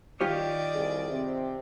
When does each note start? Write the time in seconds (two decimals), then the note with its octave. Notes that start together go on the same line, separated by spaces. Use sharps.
0.21 D#3 F4 G4 C#5 D5
0.74 C2 G#4
1.10 C3 C4